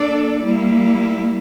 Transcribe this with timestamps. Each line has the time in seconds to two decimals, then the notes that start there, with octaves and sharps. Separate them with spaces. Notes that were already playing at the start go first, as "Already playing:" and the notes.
Already playing: A#3 D4 A4 D5
0.43 G3 A#3 E4